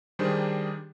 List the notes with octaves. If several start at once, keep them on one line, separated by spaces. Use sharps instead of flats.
D#3 G3 D4 G#4 C5